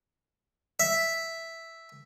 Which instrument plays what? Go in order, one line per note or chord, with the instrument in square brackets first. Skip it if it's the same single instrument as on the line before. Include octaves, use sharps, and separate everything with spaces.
[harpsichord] E5